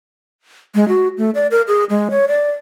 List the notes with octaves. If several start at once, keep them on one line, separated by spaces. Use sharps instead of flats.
G#3
F#4
A3
D5
A#4
G#4
G#3
C#5
D5